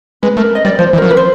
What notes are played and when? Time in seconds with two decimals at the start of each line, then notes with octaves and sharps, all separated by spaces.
0.23 G#3 B4
0.37 A3 A#4
0.55 D#5
0.65 G3 D5
0.78 F3 C5
0.93 E3
0.98 F#3 A#4
1.07 F3
1.10 B4
1.17 C5